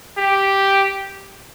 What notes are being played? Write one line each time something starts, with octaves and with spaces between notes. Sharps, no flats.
G4